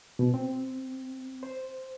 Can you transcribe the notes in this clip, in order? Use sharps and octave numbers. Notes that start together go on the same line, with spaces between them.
B2
C4
C5